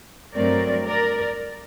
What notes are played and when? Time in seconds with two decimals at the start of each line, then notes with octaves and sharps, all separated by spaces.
0.35 G2 F#3 A3 C4 A#4 D5
0.86 A#4 D5